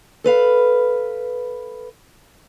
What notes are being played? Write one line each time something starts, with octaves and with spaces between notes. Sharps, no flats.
A4 B4 F5